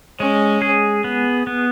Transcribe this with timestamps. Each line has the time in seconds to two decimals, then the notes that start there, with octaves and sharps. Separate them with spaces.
0.20 G#3 C#4
0.62 G#4
1.04 B3
1.47 B3